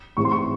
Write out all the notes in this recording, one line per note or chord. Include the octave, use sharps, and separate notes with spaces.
A2 E3 G#3 C4 C#6
C6
C#6